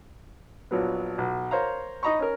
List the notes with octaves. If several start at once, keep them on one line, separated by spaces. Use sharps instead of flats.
A#1 F#3 B3
B1
A#4 C5 C#5 F5 A#5
D#4 D#5 A#5 B5 C#6
C#4 A#4